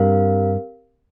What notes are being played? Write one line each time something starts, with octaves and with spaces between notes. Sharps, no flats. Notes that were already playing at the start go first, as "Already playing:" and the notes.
Already playing: G2 C4 G4 A#4 F5